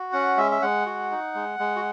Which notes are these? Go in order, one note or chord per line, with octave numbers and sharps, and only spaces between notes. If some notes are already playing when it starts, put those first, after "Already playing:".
Already playing: F#4
C#4 F#5
G#3 E5
E5
G#3 F#5
F#4
D#4
G#3
G#3
F#4